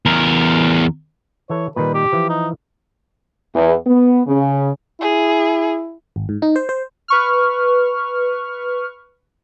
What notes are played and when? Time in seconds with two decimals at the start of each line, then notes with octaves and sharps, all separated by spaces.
0.06 E2 A#4
1.50 E3 A4 C#5
1.76 A#2 D#3 G3 B4
1.94 G4
2.12 E3 F3
2.29 D#4
3.54 E2
3.86 B3
4.26 C#3
5.01 E4 G#4
6.16 G#1
6.29 G#2
6.42 D#4
6.56 C5
6.69 C5
7.08 B4 C#6 F6